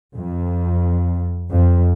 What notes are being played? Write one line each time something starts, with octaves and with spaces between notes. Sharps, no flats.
F2
F2